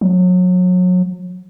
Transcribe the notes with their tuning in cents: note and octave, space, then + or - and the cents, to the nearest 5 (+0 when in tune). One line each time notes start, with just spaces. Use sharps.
F#3 -30